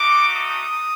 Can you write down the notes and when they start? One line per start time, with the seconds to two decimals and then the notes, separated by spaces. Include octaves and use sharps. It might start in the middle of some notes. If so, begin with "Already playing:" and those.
Already playing: A3 D#4 F#4 D6
0.35 D#6